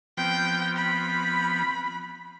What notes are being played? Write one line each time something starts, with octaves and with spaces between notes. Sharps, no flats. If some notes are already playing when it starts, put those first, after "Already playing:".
F3 B3 C4 G5
B5